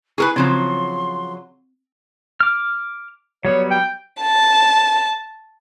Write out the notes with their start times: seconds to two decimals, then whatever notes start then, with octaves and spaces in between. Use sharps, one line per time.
0.18 E4 G#4 A#4 B4 C#6
0.36 C#3 F3 F#3 C4 C6
2.40 D6 F6
3.45 F#3 G3 B3 C#5
3.71 G5
4.22 A5